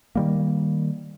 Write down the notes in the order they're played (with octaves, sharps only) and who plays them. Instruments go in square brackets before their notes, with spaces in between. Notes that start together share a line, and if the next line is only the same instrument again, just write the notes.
[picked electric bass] D#3 G3 A#3